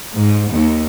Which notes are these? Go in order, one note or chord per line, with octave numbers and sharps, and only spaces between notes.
G#2
D#2